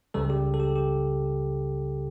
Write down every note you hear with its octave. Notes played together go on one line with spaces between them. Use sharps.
C#2 C#3 G3 A4
G4
A4
G4
G4